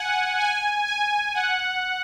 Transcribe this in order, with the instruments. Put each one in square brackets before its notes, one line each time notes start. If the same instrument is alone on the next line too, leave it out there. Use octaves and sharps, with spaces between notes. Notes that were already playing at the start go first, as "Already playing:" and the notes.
Already playing: [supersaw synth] F#5 G#5
G#5
G#5
F#5